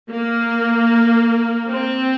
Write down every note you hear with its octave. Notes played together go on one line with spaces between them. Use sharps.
A#3
C4